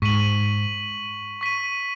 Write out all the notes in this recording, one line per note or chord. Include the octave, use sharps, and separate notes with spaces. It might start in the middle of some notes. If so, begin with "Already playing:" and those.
G#2 C#6 B6 D#7 F#7
C#6 B6 D#7